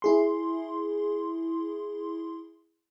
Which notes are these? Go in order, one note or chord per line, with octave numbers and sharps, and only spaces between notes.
E4 G#4 C6